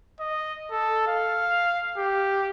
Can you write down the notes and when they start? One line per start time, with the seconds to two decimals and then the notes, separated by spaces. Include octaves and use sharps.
0.20 D#5
0.71 A4
1.08 F5
1.98 G4